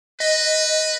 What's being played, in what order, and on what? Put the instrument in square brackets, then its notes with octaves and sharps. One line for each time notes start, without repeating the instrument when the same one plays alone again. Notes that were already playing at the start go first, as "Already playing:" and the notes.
[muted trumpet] B4 [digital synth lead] D#5